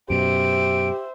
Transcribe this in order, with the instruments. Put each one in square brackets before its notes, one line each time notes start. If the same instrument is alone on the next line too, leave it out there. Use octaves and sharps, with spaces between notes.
[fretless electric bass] F#2 B2 [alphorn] G4 [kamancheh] C5 E5 [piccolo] D7